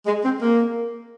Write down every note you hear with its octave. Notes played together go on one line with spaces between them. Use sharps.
G#3
C4
A#3